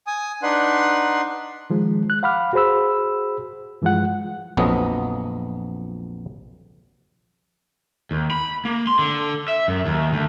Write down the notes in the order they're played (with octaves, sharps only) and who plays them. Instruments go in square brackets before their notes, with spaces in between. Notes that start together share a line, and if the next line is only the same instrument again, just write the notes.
[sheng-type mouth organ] G#5 D#6
D4 D#4 B4 F#5 C6
[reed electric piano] D#3 F3 G#3
F#6
F5 F#5 B5 D6 F6
F#4 G#4 C5 B5 E6
G2 E3 F3 G#3 F4 F#5
[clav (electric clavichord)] A#1 F2 F3 F#3 B3 D#5
[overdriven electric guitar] D#2
B5
A#3
C6
D3
E5
F#2
D#2
D2